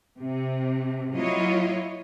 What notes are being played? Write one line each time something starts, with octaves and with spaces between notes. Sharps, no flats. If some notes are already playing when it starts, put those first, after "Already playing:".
C3
F#3 A#3 E4 F4 C#5 D#5